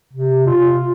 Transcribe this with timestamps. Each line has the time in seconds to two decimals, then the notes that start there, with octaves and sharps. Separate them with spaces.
0.13 C3
0.46 F4